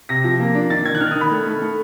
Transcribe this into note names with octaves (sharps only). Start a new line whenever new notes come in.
C3 A#6
F3
A#3
D4
D#3 A6
D#3 G#6
F#6
D#3 F6
D#3 D#6
B5
A3
A3
A3